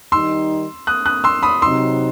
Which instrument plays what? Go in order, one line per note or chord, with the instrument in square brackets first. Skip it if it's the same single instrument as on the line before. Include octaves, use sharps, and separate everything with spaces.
[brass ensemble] D#3 G3 D#4 [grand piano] C6 E6
[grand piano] D#6 F#6
D#6 F#6
C6 E6
B5 D#6
[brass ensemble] C3 F#3 C4 D#4 [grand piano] C6 E6